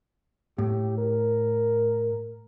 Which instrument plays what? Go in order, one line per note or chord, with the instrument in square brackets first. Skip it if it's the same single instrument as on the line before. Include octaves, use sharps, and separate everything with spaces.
[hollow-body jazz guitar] A2 [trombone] G4
[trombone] A#4